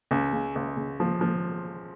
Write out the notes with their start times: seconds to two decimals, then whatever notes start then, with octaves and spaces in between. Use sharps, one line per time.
0.11 C#2
0.33 C#3
0.55 C#2
0.77 C#3
1.00 F3
1.21 F3